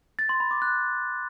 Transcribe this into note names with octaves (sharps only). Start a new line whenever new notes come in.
A6
C6
B5
D6
F#6